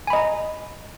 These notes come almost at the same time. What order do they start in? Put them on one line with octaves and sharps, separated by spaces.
G#5 B5 D#5 A#5